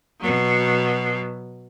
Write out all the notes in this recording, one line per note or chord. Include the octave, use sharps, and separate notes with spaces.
B2 F#3